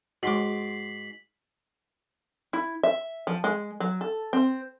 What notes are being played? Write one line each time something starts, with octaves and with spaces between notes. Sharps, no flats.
G#2 G#3 F#4 C6 D6 B6 C7 F#7
E4
E5
F3
G#3
F#3
A4
C4